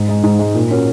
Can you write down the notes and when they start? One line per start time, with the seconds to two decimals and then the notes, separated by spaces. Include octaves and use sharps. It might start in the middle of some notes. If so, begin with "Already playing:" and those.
Already playing: G#2
0.08 G#3 D#4
0.24 G#2
0.39 G#3 D#4
0.54 A#2
0.70 A#3 C#4 F#4